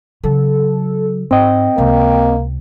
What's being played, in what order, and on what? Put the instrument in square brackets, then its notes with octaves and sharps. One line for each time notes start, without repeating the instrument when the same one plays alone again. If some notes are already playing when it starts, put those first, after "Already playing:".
[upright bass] C#3 F#3 [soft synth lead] A4
[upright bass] G#2 [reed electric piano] C4 D#5 [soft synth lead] G5
[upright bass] C#2 C3 [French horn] A#3